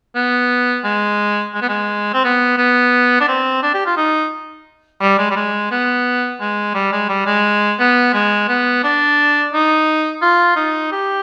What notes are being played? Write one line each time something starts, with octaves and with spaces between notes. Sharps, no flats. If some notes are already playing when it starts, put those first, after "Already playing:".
B3
G#3
G#3
B3
G#3
C4
B3
B3
D4
C4
D4
G4
F4
D#4
G3
G#3
G3
G#3
B3
G#3
G3
G#3
G3
G#3
B3
G#3
B3
D4
D#4
F4
D#4
G4